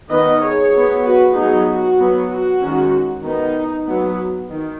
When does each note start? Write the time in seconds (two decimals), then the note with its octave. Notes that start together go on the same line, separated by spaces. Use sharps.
0.09 D#3 B3 B4 D#5
0.41 G#4 C#5
0.72 F#3 B3
1.04 F#4 B4
1.35 F#3 B3 D#4 G#4
1.66 F#4
1.99 F#3 B3
2.30 F#4
2.60 D#3 G#3 C#4
3.23 D#3 B3 D#4
3.87 F#3 B3
4.50 D#3